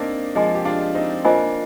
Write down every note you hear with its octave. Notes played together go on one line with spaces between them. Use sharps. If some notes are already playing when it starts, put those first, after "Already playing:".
Already playing: A#3 C4 D4 D#4
F3 G#3 G#4 D#5 G#5 C6
G4
D4 F4
C4 D#4
A#3 D4 F4 C5 D#5 G#5 C6